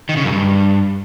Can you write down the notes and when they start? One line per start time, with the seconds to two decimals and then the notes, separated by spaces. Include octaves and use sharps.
0.09 D#3
0.17 C#3
0.25 F#2
0.32 G2